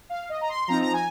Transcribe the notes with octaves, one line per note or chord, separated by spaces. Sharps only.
F5
D#5
A#5
C6
F3 C4 D#4 A#5
A#5
G#5